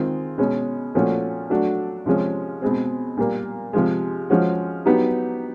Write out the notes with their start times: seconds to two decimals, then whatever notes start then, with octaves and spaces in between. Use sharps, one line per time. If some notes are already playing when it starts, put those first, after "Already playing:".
Already playing: D#3 G#3 C4 F4
0.38 B2 G#3 C#4
0.95 A#2 F3 A3 C#4 F#4
1.50 F#3 A3 D4 F#4
2.06 C3 F3 G#3 C#4
2.62 B2 G#3 C4
3.17 A#2 G3 A#3
3.73 C3 F3 G#3
4.30 F3 G#3 C#4 F#4
4.86 F#3 B3 D#4 G4